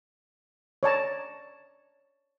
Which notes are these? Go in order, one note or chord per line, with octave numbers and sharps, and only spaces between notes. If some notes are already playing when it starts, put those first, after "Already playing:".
C#5 D5 A5 A#5